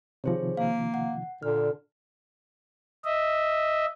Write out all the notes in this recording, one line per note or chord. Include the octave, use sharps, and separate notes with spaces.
C3 D#3 F3 G#4 C5 C#5
A#3 F5
F#5
A#2 D3 F6
D#5 E5